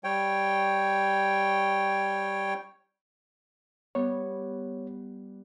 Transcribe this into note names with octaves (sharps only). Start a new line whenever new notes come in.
G3 C#5 G5
G3 B3 C#5